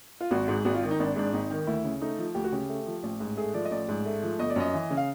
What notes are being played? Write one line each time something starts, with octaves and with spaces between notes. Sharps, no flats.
F4
G#1 F#4
G#2
G#1 F#4
F4
D#3
D#4
G#1 D4
G#2 D4
G#1 D#4
D#3
D2 E4
C#3
A3 D#4
F3
D2 G4
F#4
C#3 G4
A3
F3
A1
G#2
A3 G#4
F3 D5
D#5
A1 D5
G#2
A3
F3
G1 D#5
D5
F#2 D#5
E3
C#3
F5